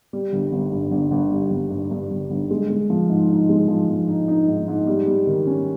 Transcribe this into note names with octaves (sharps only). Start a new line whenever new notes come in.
G3
G1
G1
G2
G1
G1
G3
G1
G2
G2
G1
G1
G#3
G#3
F3
G#2
D#4
G#3
F3
F3
D#4
D#4
G#2
G#2
G3
G3
D#3
C#4